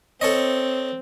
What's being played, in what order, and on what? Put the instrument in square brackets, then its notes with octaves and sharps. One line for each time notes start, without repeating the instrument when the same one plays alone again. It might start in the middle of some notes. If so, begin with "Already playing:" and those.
[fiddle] C4 [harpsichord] A4 C#5 D#5